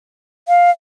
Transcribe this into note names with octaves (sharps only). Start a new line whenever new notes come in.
F5